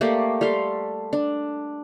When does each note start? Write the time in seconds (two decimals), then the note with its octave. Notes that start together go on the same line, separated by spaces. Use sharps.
0.01 A3 A#3 G4 D5
0.41 G3 A4 F5 C6
1.13 D4